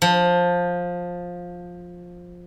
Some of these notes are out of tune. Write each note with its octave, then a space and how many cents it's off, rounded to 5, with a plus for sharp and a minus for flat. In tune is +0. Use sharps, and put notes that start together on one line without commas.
F3 +15